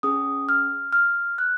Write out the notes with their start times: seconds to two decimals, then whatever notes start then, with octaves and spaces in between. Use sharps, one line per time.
0.03 C#4 G#4 D#6
0.49 F6
0.92 F6
1.38 F#6